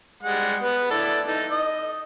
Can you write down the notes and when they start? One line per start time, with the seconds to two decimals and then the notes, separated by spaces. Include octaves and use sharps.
0.23 G3 G#3 F#5
0.63 B3 B4
0.91 E4 A4 D5
1.28 D#4 A4
1.52 D#5